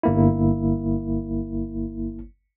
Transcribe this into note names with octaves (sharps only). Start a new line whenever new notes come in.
G1 A#3 E4